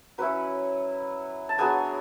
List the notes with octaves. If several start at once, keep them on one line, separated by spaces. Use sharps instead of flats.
F#3 C#4 E4 B4 B5
A5
F#3 B3 D4 G#4 G#5